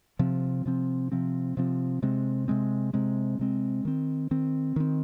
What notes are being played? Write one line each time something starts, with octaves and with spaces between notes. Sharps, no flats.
C3 F3 C4
C3 F3 C4
C3 F3 C4
C3 F3 C4
C3 G#3 C4
C3 G#3 C4
C3 G#3 C4
C3 G#3 C4
D#3 C4
D#3 C4
D#3 C4